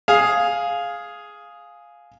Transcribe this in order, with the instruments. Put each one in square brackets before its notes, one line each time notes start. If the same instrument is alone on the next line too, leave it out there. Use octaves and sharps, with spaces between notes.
[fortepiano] G#4 F5